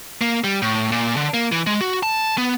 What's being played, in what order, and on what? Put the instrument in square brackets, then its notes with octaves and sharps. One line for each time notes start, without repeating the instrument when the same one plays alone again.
[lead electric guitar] A#3
G3
A2
A#2
D3
A#3
E3
G#3
F#4
A5
B3